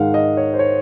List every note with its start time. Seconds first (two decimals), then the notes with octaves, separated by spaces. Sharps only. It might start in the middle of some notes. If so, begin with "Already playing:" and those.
Already playing: G#2 D#3 G#3 F5 F#5
0.14 D#5
0.37 C#5
0.54 C5
0.59 C#5